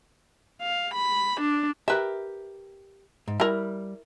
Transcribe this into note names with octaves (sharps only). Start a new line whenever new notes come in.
F5
B5
D4
G4 A#4 B4 E5
G#2
G3 E4 A#4